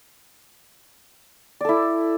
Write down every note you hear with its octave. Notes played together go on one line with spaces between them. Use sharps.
E4 A4 D5